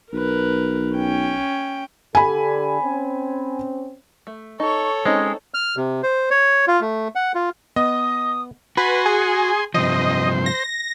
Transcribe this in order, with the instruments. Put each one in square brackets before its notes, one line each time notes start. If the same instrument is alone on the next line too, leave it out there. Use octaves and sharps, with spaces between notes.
[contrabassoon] B1 [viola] A#4 B4
[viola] C#4 G5
[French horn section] D3 G4 A4 [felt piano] G#5 B5
[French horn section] C4 C#4
[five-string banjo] A3
[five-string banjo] D#4 [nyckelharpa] A4 C#5 [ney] C#6
[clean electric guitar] G#3 [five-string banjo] C4 D#4 [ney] C#4
[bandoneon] F6
C3
C5
C#5
F4
A3
F#5
F4
[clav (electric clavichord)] B3 [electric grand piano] D#5 [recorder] D#6
[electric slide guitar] F#4 [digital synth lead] B4 [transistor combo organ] G#5 C6
[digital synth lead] G#4
[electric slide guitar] G2 C3 F3 [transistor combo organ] C5 [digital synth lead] D#5
[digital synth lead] A#6